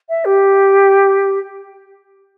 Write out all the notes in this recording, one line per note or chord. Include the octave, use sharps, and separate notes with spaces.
E5
G4